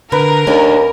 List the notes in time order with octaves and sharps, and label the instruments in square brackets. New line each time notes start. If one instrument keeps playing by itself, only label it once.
[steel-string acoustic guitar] D3 [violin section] A#4 [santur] B4
[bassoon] D#2 [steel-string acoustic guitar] A3 C#4 D4